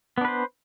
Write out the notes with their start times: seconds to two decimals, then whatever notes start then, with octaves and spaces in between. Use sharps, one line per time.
0.18 B3
0.21 D4
0.25 B4
0.28 C5